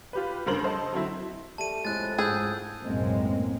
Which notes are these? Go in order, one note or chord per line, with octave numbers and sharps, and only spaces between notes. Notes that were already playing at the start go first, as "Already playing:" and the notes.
F4 G4 B4
F1 G2 C#3 A#4 C5 F#7
A4 C5 D#5 A5
D3 F#3 C4 E4
G3 A3 A5 D#7
F2 A2 G#3 E4 F#6 A6
G#2 G#4 E6 G6
B1 F#2 A2 G#3 A#3 C4